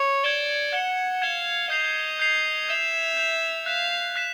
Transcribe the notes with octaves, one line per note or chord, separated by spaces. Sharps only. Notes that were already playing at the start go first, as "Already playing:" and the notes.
Already playing: C#5
D5 G#6 C#7 E7 G7
F#5 G#6 C#7 E7 G7
F5 G#6 C#7 E7 G7
D#5 G6 C7 F7
G6 C7 F7
E5 G6 C7 F7
G6 C7 F7
F5 F#6 B6 E7
F#6 B6 E7